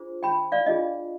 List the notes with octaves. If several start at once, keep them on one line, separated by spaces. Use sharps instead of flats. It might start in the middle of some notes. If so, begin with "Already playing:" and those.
Already playing: D4 F4 G#4 C5
G5 B5
D5 F5
D4 F4 G#4 D#5